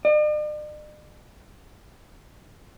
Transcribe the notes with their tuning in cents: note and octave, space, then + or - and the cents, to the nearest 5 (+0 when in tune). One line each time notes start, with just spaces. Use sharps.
D5 +45